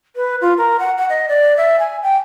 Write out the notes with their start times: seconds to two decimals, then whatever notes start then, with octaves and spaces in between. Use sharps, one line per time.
0.16 B4
0.41 F4
0.58 A#4
0.79 F#5
0.98 F#5
1.09 D#5
1.28 D5
1.57 E5
1.79 G#5
2.03 G5